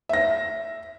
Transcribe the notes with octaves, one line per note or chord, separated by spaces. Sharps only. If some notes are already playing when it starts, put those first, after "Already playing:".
E5 A#6